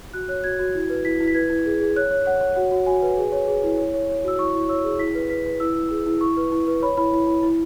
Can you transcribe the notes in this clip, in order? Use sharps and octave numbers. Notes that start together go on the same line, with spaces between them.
F#4 F#6
C#5 F#6
F#4 G#6
F#4
E4
B4
E4 B6
E4
B6
B4 G#6
E4
G#4
G#4
C#5 F#6
C#5
C#5 F#5
C#5
F#4 F#5
F#4
F#4 G#5
B4
G#4
C#5
G#4
E4
C#5
C#5
C#5
F#4 E6
E4 C#6
E4
C#5 E6
G#4
E4 B6
B4
B4 B6
B4
E4 E6
E4
G#4
E4
E4 C#6
B4
E4
B4
C#5 B5
E4 B5
E4
E4
E4